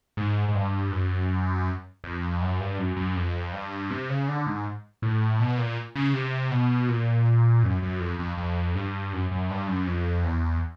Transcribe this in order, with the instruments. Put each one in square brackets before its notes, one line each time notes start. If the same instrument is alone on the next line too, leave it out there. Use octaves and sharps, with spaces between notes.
[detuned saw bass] G#2
G#2
G2
F#2
F2
F#2
G2
F#2
F#2
F2
G2
C3
C#3
D3
G#2
A2
B2
A#2
C#3
C3
B2
A#2
F#2
F#2
F2
F2
F2
G2
F#2
F#2
G2
F#2
F2
E2